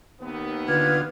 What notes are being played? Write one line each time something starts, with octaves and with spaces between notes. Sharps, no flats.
D#2 B3
D3 F4 B4 G#6